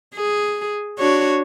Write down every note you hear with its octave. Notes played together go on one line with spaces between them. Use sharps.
G#4
D4 F#4 C#5